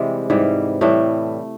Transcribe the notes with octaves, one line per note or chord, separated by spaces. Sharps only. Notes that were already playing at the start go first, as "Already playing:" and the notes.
Already playing: C3 E3 G3 G#3
G#2 E3 G3
A2 E3 G3 A3